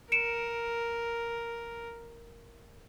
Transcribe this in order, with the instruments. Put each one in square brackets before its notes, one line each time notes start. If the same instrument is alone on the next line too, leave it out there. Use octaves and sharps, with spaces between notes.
[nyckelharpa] A#4 [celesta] C#7 D7 E7